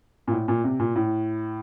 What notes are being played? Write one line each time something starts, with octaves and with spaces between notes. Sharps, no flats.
A#2
A2
A#2
C3
A#2
A2